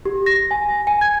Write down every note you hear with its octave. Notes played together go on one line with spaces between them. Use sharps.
G4
A#6
G#5
G#5
G#6